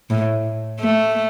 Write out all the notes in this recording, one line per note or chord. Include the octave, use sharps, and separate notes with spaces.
A2
A3